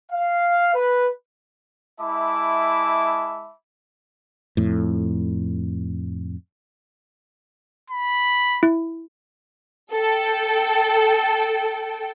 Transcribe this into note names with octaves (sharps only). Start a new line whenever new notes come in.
F5
B4
G#3 E4 E5 A5 B5 D6
F2 A2
B5
E4
A4 G5